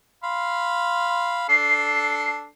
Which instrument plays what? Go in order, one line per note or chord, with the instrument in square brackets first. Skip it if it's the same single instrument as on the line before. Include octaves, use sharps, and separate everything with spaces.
[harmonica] F5 B5 C6
[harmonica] D4 A4 [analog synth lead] C7